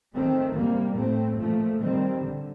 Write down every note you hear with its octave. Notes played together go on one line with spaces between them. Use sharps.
D#3 A3 C4
C3 G3 A#3
A2 A3 C4
A#2 F3 A3
D#3 G3 C4
D3